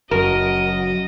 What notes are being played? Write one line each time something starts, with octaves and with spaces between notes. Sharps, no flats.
F#1 F#2 F#4 A#4 D#5